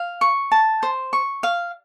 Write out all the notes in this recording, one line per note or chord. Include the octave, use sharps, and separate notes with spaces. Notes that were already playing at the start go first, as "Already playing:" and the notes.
Already playing: F5
C#6
A5
C5
C#6
F5